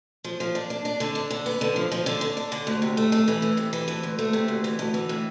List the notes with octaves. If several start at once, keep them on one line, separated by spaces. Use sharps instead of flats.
F3
F3
D4
D4
D4
D3
D4
D3
B3
D3
F3
F3
D3
D3
D4
D3
D2
C3
A3
A3
E3
E3
C3
E3
D2
D2
A3
C3
D2
E3
D2
E3
A2